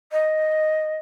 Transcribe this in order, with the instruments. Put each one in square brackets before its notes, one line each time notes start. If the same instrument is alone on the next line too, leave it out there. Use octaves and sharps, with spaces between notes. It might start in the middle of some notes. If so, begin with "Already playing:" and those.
[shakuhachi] D#5